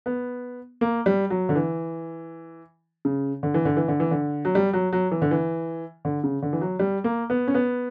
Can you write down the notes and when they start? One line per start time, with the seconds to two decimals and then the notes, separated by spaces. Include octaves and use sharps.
0.06 B3
0.81 A#3
1.06 G3
1.30 F#3
1.49 D3
1.56 E3
3.05 C#3
3.43 D3
3.54 E3
3.65 D3
3.77 E3
3.88 D3
4.00 E3
4.11 D3
4.45 F#3
4.55 G3
4.73 F#3
4.93 F#3
5.11 E3
5.22 D3
5.31 E3
6.05 D3
6.24 C#3
6.42 D3
6.53 E3
6.61 F#3
6.79 G3
7.04 A#3
7.30 B3
7.48 C#4
7.54 B3